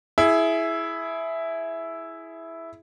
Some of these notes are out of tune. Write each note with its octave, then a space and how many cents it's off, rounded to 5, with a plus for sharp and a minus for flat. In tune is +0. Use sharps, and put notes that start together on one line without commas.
E4 +0 G#4 +20